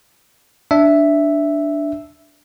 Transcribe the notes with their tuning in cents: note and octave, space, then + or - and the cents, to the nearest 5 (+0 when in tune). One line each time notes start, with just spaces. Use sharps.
D4 +0 E5 +0